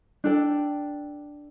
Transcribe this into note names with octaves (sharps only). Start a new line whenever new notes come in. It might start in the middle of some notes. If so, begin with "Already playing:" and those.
D4 A4 D5 G5